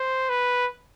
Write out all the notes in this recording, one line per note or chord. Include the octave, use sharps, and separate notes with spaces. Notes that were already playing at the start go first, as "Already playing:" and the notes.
Already playing: C5
B4